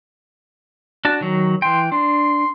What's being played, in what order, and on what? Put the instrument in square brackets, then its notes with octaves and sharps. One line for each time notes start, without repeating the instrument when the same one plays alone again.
[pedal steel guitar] D4 F#4 A5
D#3 F#3
[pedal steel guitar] E3 G5 [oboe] C6
[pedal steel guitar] D4 [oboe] C6